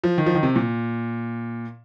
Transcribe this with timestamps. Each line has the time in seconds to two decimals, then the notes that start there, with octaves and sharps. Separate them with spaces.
0.04 F3
0.18 D#3
0.26 F3
0.35 D#3
0.43 C3
0.56 A#2